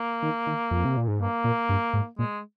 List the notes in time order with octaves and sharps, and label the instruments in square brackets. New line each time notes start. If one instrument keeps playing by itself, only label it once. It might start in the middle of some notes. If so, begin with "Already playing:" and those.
Already playing: [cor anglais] A#3
[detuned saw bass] D#3
D#3
F2
C3
A#2
G#2
[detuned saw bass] G2 [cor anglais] A#3
[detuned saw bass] A#2
G2
G#2
[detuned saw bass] A#2 [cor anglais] G#3